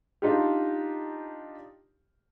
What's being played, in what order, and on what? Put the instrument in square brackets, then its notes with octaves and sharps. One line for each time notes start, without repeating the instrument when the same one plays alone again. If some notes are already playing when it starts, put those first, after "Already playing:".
[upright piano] D4 D#4 F4 G4